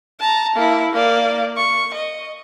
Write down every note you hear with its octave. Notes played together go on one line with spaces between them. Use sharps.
A5 A#5
A#3 E4
A#3 D5
C#6
D#5